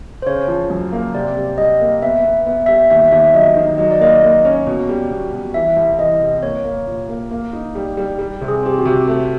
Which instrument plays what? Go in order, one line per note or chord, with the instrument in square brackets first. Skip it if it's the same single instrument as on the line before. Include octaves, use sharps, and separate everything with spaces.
[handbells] C5
[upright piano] C#3 [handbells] C#5
[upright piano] F3
F#2
A#3
[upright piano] C3 [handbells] D5
[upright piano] G3
[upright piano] G3 [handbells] D#5
[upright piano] A#3
[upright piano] B3 [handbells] E5
[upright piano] B3
[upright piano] B3 [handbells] E5
[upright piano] G3 [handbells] E5
[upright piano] D#2 [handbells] E5
[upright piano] D#2 [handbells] E5
[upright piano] F#3 [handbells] D#5
[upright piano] D#3
[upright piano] F#3 [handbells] D#5
[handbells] D5
[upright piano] A#3 [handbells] D#5
[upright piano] A#3
C#4
B2
G3
B2
B2
[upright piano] E3 [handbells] E5
[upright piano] C2
[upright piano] E3 [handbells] D#5
[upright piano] C3
[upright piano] A#3 [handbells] C#5
[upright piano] A#3
A#2
A#3
A#3
D#4
G3
G3
G3
C3
[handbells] G#4
[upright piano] C4 [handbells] G4
[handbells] F#4
[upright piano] C3
A3